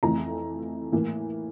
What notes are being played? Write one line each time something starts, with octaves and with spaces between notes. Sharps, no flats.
F2 E3 A3 A#5
A2 E3 A#3